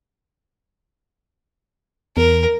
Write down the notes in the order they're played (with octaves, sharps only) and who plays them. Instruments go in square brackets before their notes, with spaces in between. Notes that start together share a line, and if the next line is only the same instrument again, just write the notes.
[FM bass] E2 [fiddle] A#4